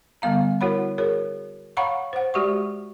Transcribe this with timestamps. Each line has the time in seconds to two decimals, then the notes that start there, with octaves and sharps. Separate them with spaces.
0.22 D3 G3 B3 F5 A#5
0.61 E4 F#4 A#4 C#5 F#5 B5
0.98 F#4 G#4 A#4 C#5
1.77 C#5 F5 F#5 A#5 B5 C#6
2.13 C5 F#5
2.34 G#3 F#4 G4 D5 E5 C#6